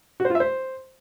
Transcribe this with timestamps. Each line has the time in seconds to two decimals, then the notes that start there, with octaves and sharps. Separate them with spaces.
0.20 F#4
0.25 C5
0.30 F4
0.35 E5
0.40 C5